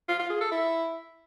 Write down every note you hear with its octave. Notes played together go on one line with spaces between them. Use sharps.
F4
F4
G#4
A4
E4